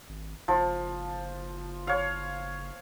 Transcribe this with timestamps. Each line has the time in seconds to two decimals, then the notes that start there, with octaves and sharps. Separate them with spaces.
0.09 G#1
0.48 F#1 F3
1.87 C#5 F5